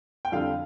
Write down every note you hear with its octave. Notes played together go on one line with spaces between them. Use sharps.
G5
F2 D3 G3 F5